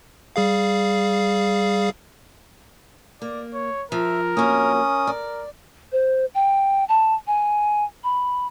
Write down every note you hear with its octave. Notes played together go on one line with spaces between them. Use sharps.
G3 G#4 F5
A#3 D5
C#5
F3 A#4 E5
F2 F#3 A#3 C#4 D#6
A#4
D5
C5
G5
A5
G#5
B5